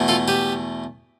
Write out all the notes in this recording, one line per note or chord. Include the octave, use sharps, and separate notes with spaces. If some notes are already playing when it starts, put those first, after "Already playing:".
Already playing: E2 B2 A3
F4 A4
G4 B4